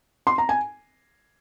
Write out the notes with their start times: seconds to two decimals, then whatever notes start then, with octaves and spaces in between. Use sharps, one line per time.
0.27 C6
0.38 A#5
0.49 G#5